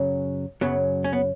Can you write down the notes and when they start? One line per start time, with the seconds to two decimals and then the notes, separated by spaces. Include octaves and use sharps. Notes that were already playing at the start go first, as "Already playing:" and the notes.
Already playing: F#2 C#3 F#3
0.61 F#2 C#3 F#3 B3
1.04 C#4
1.13 B3